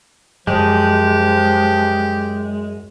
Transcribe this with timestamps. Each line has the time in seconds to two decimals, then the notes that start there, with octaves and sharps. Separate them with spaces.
0.47 F#2 F3 G#3 G4